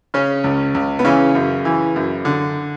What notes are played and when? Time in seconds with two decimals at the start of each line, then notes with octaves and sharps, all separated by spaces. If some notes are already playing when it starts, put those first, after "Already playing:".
0.14 C#3 C#4
0.44 C#2
0.74 C#2
0.99 B3
1.05 C#3 E3 C#4
1.35 F#2
1.65 E3
1.96 F#2
2.25 D3